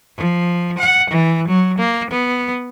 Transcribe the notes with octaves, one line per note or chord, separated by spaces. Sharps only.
F3
F#5
E3
F#3
A#3
B3